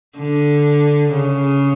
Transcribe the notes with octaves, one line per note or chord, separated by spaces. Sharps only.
D3
C#3